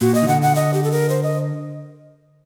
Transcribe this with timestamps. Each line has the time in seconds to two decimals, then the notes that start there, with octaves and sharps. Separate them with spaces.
0.01 A#2 F#4
0.15 D#5
0.23 D#3
0.28 D3 F#5
0.42 F#5
0.55 D#5
0.74 G4
0.84 A4
0.92 A#4
1.10 C5
1.23 D#5